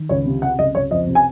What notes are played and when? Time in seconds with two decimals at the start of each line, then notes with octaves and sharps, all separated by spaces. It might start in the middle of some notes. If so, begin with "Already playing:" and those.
Already playing: D#3
0.09 C#2 C#5
0.26 C3
0.42 C3 F#5
0.59 C#2 D#5
0.75 C#2 C#5
0.91 F2 D#5
1.07 C3
1.15 G#5